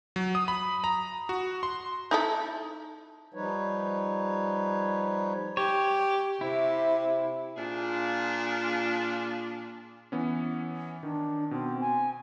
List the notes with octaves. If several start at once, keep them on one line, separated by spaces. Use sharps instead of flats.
F#3
D#6
B5
A#5
F#4
C6
D#4 E4 A4
F3 G3 D#4 B4 C#5
G4 C#5
C3 E4
A#2 D4 F4 G#4
E3 B3 C#4
D#3 D4
B2 C4
G#5